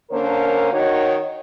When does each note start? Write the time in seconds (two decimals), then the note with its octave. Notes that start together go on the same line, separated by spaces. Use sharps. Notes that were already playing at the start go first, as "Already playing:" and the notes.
0.10 D3 A#3 C#4 D4 A#4 C5
0.72 D#3 D#4 F#4 C#5